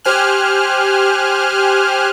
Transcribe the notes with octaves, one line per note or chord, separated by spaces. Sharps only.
G4 C5 G#5 F6 F#6